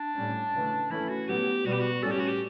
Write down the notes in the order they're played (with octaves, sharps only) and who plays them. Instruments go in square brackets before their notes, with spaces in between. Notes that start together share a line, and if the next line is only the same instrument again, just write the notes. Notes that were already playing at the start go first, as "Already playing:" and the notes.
Already playing: [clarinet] D4
[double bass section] A2 G3 C#4
C#3 E3 A3
[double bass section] E3 A3 C#4 [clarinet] E4
[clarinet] F#4
[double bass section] A2 F#3 B3 [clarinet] G4
[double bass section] B2 G3 B3 [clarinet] F#4
[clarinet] G4
F#4
[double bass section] A2 G3 C#4 [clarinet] A4
[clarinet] G4
F#4
G4